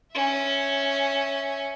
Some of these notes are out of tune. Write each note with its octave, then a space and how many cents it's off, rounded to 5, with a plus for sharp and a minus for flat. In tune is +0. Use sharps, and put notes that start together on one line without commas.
C#4 +0 E5 +0